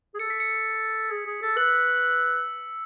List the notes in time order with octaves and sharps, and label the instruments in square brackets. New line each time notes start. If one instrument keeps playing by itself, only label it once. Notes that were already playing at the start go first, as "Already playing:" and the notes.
[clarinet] G#4
[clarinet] A4 [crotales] C#7
[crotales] B6
C#7
[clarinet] G#4
G#4
A4
[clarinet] B4 [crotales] E6